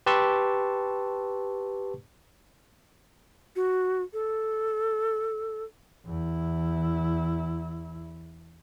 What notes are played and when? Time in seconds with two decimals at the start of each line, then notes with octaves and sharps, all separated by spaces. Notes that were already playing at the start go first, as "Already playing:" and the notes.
0.06 G4 B4 A5 C6 C#6 E6
3.56 F#4
4.13 A4
6.06 E2 E4